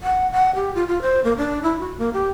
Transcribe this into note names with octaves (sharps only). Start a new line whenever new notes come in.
F#5
F#5
G4
F4
F4
C5
A#3
D4
E4
F#4
A#3
G4